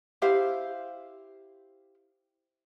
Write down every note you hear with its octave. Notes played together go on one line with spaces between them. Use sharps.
E4 G4 C5 F5